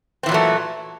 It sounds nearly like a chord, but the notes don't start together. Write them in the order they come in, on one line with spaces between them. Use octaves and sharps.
C4 E3 A#2 F#3 A3